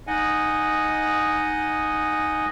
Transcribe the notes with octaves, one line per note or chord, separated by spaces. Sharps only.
D#4 D#5 F#5 G#5